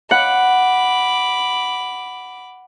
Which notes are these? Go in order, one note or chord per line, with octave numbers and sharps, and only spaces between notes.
F#5 B5 D6